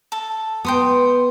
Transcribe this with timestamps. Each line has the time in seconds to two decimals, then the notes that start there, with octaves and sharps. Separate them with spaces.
0.12 A4
0.65 B3 G5 C6 D#6